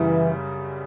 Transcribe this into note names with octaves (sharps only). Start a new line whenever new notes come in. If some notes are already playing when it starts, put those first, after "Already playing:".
Already playing: F#2 C#3 E3 G3